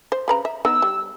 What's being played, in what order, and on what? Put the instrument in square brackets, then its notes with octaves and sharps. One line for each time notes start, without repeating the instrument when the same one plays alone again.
[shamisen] C5
C#3 B4 A#5
E5
[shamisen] B3 D#4 [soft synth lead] E6
[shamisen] G3